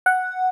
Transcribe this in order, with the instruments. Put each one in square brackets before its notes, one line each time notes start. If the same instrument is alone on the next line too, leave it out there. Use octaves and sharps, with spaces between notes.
[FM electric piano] F#5